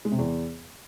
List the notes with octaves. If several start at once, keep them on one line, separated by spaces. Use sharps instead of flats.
G#3
C3
E2